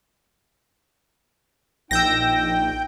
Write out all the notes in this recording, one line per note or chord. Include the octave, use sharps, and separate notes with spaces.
A#1 D#4 G5 E6 G6 A#6